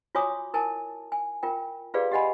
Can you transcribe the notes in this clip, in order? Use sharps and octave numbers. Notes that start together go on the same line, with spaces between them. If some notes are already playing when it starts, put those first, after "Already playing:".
F4 F#4 C#5 G#5 D6 D#6
E4 A#4 G#5 A5
G#5
F4 A#4 G5
F4 G4 G#4 B4 D5 F5
G4 D#5 F#5 G#5 B5